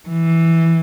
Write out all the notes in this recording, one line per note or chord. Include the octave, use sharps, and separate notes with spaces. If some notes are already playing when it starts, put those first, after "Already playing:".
E3